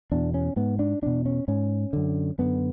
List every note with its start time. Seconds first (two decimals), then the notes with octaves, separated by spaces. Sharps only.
0.12 E2 B2 D4
0.34 C#4
0.56 G#2 B3
0.79 D4
1.02 E2 B2 D4
1.26 C#4
1.48 G#2 C#4
1.93 F#2 D3
2.38 F#2 D3 B3